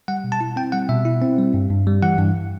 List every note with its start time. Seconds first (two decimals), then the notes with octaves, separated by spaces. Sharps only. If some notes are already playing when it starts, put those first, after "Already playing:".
0.08 G3 F#5
0.24 B2
0.32 A5
0.41 E4
0.56 C4 G5
0.72 G3 F#5
0.89 B2 E5
1.05 E4
1.22 C4
1.38 G3
1.54 G2
1.70 G2
1.87 G3
2.03 E3 F#5
2.19 G2